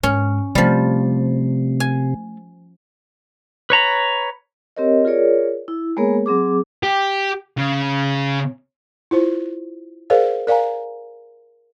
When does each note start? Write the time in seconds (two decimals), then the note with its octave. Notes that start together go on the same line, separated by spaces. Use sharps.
0.03 G#2 C#4
0.55 C3 F3 G3 A3
1.80 G#5
3.70 B4 C#5 A#5 B5
4.77 C4 G4 A#4 C#5 D#5
5.05 F4 G#4 A#4 C#5 D5
5.68 E4
5.97 G#3 A#3 B3 G#4 A#4 C#5
6.26 F#3 C4 G#4 D6
6.83 G4
7.58 C#3
9.11 E4 F4 C5
10.10 G#4 A#4 C5 D5 F5
10.47 A#4 D5 F5 G#5 A#5